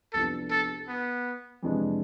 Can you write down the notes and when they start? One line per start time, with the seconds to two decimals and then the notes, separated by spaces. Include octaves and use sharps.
0.13 C2 C3 F3 B3 D4 A4
0.51 A4
0.88 B3
1.63 F2 C3 E3 G#3 D4